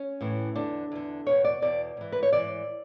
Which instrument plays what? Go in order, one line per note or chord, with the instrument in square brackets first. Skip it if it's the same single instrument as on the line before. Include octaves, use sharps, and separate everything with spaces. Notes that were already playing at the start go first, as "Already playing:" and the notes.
Already playing: [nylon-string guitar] C#4
A2 E3
E2 D3 D4
E2 D3
E2 B2 C#5
D5
E2 B2 D5
G#2 E3
B4
C#5
G#2 E3 D5